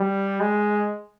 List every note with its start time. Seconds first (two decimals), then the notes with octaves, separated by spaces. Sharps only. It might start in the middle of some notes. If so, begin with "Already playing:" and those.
Already playing: G3
0.40 G#3